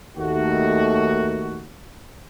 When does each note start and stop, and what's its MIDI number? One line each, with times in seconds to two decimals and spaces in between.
0.18 1.66 39
0.18 1.66 51
0.18 1.66 57
0.18 1.66 66